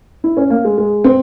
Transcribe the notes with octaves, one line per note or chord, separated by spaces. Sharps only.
E4
C#4
A#3
G#3
G#3
C4